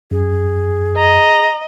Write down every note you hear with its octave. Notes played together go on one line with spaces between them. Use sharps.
F#2 G#4
D#5 A#5